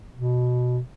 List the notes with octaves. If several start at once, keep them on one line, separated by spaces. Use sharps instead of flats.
B2